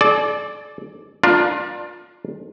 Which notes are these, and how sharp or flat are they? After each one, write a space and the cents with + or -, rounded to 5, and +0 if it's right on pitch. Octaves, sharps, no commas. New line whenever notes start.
A4 -40 D5 +0
D4 +20 F4 +20 A#4 +45